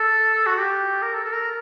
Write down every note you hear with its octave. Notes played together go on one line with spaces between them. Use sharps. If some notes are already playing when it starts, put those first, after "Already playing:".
Already playing: A4
F#4
G4
A#4
A4
A4
A#4